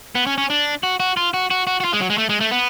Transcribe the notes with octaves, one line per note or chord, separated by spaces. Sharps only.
B3
C#4
C#4
D4
F#4
F#4
F4
F#4
F#4
F#4
F#4
F4
G#3
F#3
G#3
A3
G#3
A3
B3